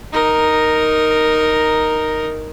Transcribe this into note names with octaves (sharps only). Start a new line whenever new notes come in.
D#4 A#4